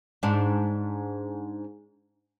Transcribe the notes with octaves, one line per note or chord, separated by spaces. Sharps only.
G#2 D4